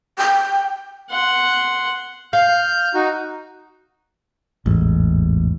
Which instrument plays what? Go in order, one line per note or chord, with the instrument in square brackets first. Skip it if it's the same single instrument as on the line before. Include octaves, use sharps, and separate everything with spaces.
[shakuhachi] G5
[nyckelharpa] F#5 C6
[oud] F5 [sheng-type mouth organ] F6 G6
[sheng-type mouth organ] D#4 F#4
[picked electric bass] A1 [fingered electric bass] E2 G#2